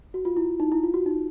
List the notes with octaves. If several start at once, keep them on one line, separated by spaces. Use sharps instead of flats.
F#4
F4
E4
D#4
E4
F4
F#4
D#4